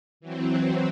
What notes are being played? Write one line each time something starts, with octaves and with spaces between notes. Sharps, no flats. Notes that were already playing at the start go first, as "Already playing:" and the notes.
E3 F#3 C4